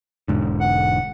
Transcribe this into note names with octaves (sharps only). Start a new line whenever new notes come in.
E1 G#2 D3
F#5